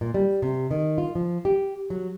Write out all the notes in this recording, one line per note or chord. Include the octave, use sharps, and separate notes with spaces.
A#2
G3
C3
D#3
F4
F3
G4
F#3